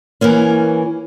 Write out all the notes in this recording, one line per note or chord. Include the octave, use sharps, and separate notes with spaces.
E3 A#3 C#4